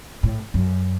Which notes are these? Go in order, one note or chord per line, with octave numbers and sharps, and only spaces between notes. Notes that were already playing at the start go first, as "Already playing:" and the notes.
A2
F#2